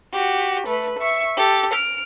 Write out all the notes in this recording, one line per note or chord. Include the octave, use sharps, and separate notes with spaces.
F#4 G4
A3 B4
E5 C#6
G4 A4
F6 D7